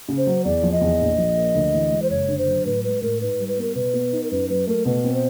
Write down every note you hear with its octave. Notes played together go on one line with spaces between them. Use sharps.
C#3
C5
F#3
E2 D5
F3
D#5
E2
A#1
F3
A#3
D2
E3
G#3
C5
F#1 C#5
D3
C5
F#3
A2 B4
G#3 B4
A2 A#4
G#2 B4
G3
B4
B3 A#4
B2 B4
B3
D#4
A#4
F#2 B4
F#3 B4
A3 A#4
B2 B4
C4
C5